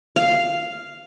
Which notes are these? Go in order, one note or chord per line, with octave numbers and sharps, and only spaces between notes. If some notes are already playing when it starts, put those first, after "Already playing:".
F5